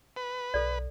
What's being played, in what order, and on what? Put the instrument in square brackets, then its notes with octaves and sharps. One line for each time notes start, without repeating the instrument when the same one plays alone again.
[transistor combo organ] B4
[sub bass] B1 [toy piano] A4 D5